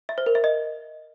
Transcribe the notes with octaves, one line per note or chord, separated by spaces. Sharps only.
E5
C5
A#4
E5
D#5